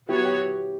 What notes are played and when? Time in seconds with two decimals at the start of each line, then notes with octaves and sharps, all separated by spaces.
0.08 F#3 B3 E4 F#4 G4 C#5
0.25 G4